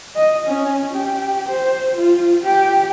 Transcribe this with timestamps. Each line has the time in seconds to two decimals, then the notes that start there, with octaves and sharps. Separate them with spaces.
0.16 D#5
0.47 C#4
0.93 G4
1.49 C5
1.96 F4
2.44 G4